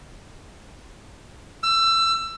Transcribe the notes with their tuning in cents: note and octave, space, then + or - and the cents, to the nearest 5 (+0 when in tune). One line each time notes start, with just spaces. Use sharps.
E6 +25